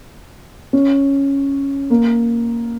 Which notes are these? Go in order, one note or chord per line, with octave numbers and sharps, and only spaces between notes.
C#4
A#3